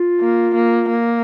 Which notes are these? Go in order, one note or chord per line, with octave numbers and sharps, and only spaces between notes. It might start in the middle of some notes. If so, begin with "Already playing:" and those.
Already playing: F4
A#3
A#3
A#3